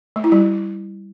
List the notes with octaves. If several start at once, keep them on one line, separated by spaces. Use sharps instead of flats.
A3
E4
G3